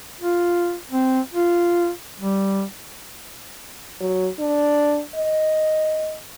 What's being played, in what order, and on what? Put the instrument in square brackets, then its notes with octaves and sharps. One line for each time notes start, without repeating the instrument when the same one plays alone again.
[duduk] F4
C4
F4
G3
[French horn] F#3
D4
D#5